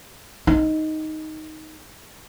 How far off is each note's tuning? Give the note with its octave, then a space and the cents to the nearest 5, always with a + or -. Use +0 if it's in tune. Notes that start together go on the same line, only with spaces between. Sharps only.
D#4 +5